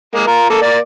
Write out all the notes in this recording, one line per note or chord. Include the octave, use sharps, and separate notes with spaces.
G#3 A#3
F4 A#4
A#3 A4
A#3 D5